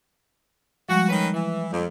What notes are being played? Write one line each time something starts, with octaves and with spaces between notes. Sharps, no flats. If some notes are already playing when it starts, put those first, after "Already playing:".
F3 G3 G#3 F#4
D#3 C#4 B4
E3
F2